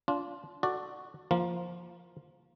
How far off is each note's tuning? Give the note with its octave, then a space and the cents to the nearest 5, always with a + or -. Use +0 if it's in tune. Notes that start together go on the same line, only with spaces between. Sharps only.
D4 -30 F4 +0
F#4 +0 A4 +0 D5 +10
F3 +0 A#3 +15 F5 +0